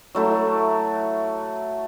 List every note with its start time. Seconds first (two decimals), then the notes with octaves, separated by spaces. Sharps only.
0.15 F#3 A3 E4